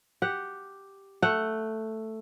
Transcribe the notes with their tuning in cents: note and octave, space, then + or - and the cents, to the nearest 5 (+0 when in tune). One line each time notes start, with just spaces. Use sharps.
G4 +0 F#5 +0
A3 +5 F#5 +0